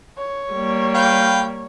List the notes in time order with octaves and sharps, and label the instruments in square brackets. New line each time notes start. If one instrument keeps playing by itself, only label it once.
[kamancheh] C#5
[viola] G3 A#3
[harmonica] B4 F5 G5